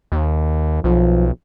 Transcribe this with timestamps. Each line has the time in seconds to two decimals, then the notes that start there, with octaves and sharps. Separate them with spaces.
0.12 D#2
0.84 B1 F3